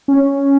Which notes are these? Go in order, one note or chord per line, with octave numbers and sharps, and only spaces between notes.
C#4